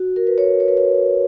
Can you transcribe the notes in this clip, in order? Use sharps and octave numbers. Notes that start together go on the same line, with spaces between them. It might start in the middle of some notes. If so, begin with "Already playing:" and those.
Already playing: F#4
A#4
B4
C#5
C#5
B4
C#5